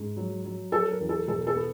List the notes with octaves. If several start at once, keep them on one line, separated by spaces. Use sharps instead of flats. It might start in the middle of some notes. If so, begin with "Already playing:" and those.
Already playing: G#2
F#3
F#3
F#3 A4
A#4
E2
A4
B2 A4
A4
B3